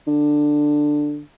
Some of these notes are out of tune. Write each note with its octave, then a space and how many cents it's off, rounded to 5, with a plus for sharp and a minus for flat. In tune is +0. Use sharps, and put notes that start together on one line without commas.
D3 +10